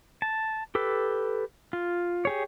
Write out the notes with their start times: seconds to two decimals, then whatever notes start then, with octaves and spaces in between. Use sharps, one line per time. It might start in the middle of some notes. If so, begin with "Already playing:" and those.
0.22 A5
0.75 G4 A4 B4
1.73 F4
2.25 G4 G#4 C#5